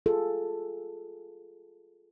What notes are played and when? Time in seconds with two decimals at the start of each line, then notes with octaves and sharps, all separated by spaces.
0.06 F4 G#4 A4